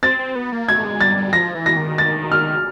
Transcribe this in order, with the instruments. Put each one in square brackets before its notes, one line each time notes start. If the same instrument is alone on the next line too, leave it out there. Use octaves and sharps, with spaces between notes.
[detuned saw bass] C4 [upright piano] A6
[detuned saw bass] C4
B3
A#3
[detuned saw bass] A3 [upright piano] G#6
[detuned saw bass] G#3
[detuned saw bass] G3 [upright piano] A6
[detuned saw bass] G3
[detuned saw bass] F3 [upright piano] A#6
[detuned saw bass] E3
[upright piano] A#6
[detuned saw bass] D#3
[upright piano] A6
F6